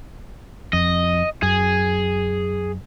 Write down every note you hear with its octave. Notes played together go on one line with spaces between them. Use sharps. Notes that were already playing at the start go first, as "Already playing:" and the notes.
F2 D#5
F#2 G#4